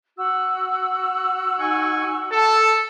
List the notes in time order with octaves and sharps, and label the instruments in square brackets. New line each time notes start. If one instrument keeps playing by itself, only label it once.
[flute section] F#4 E6
[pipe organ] D#4 G#5 C#6
[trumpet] A4 [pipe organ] A5